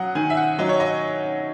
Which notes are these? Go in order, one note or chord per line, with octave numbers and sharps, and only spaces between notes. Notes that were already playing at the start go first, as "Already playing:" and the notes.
Already playing: F#3 F#5 D#6
D#3 G#5
E5
F#5
F#3 D#5
C#5
D#5